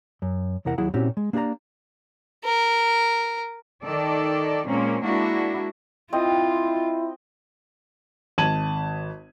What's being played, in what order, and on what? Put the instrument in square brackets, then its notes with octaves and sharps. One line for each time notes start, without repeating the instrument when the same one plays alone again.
[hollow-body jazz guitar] F#2
E2 C3 E4 A#4 F#5
D#2 F#3 E4 G#4 F#5
A#2 C4 C#4 E4 F#4 G4
G#3
A#3 D4 G4 G#4 D5 A#5
[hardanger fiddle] A#4
[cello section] D#3 A4 D5
A#2 G#3 A#3 C4 C#4
G#3 A#3 D4 E4 F#4
[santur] C4 D#5 [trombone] E4 [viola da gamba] F4
[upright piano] G#1 A5 G#6 D#7 F#7